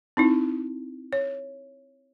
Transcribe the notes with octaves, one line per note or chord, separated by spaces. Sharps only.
C4 D#4 E4
C#5